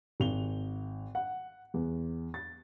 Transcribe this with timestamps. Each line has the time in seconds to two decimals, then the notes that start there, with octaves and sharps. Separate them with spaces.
0.20 G#1 F7 G7
1.15 F#5
1.74 E2
2.34 A6